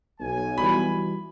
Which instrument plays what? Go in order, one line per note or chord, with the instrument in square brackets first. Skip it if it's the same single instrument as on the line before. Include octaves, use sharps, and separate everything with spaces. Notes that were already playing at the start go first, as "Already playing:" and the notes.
[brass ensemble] B1 G#5
[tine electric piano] E3 G3 F#4 [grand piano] B5